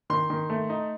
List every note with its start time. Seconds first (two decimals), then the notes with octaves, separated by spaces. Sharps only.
0.10 D#3 C6
0.30 D#3
0.50 A3
0.70 D#4